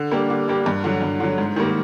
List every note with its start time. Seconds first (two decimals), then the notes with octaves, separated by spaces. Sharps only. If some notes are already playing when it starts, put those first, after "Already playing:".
Already playing: D3
0.12 G3 A#3 D4 G4
0.30 D3
0.48 G3 A#3 D4 G4
0.66 G2
0.84 D3 F#3
1.02 G2
1.20 D3 F#3
1.38 G#2
1.56 D#3 G3 A#3